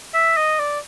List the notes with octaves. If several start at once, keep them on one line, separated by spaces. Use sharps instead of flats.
E5
D#5
D5